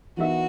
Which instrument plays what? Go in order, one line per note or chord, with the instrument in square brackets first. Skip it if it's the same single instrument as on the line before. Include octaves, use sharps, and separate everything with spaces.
[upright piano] E3 B3 D#4 A#4 E5 [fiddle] F#4